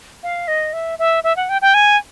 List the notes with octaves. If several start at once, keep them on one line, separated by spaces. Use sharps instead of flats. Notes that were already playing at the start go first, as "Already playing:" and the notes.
F5
D#5
E5
E5
E5
F#5
G5
G5
G#5